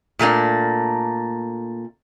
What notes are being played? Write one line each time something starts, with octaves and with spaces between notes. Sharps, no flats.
A#2 A3 A#3 D4